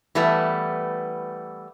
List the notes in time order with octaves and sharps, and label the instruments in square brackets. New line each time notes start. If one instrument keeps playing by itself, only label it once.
[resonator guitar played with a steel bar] E3 G3 A3 B3